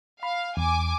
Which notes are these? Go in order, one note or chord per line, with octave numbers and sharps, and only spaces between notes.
F5 B5
E2 G#5 D6